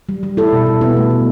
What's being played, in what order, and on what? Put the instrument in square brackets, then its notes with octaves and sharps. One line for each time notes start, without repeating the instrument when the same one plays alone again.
[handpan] G3
G3
G3 E4 A4
B2
B2
B2 B3 E4
A3
A3